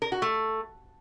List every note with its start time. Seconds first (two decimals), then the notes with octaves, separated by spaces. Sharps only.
0.02 A#4
0.12 F#4
0.22 A3